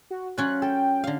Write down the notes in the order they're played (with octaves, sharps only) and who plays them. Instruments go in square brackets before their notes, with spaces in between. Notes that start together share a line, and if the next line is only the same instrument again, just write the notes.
[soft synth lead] F#4
[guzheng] F#3 C#4 F4 [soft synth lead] F#6
[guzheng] A4 [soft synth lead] G5
[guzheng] D3 F5